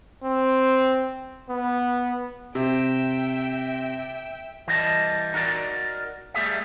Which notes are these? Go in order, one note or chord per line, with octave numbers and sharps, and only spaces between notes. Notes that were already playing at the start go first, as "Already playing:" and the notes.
C4
B3
C3 E5 G5
E3 G3 D#5 A5
D#4 F#4 A#4 D5
G3 A3 G#4 E5